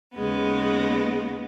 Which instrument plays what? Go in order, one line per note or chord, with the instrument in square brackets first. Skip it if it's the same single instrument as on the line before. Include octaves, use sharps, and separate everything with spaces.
[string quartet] D#2 C#3 G#3 B3